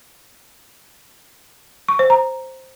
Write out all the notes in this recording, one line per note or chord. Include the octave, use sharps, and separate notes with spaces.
C#6
C5
A#5